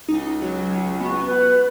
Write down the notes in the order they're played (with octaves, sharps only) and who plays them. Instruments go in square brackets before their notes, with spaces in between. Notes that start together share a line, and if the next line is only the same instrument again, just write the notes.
[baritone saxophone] C#2 [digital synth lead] D#4
[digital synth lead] F#3
[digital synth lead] B3 [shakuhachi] F#4
[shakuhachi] B4